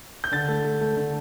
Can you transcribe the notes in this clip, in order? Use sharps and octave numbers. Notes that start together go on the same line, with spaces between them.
G6
D3 A6
A3
A3
A3
D3